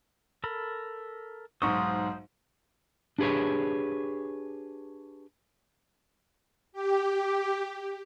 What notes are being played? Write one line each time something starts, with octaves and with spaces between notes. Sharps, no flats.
A4 A#4 B5
B1 G#2 C5 C6 C#6 D#6
D4 G4 G#4 B4 C#5
G4